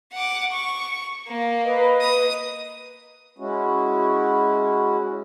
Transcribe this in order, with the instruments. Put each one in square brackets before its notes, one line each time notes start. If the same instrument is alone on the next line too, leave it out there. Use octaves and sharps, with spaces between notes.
[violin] F#5 D6
C#6
A#3
[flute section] B4 D#5
[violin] D#6
[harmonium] G#3 C#4 E4 F#4